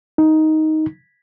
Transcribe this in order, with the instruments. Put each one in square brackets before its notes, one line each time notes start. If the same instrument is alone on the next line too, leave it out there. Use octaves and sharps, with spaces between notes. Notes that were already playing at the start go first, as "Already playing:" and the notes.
[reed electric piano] D#4